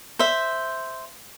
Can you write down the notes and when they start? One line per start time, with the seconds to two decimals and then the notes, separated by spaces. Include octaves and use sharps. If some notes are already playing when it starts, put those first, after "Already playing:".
0.19 C5 E5